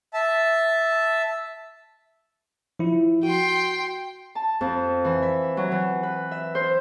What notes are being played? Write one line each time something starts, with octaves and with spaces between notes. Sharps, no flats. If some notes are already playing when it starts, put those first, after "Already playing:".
E5 A5
F3 E4
F#4 G5 C6
A5
F2
E3
E5
F#3
E3
B4
E5
C5